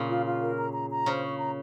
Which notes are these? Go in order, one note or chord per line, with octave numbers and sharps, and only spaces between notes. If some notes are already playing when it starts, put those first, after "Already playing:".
Already playing: A#2 C#3
F4
F4
A#4
A#5
A#5
A#5
C#3 C5
C#6
A#5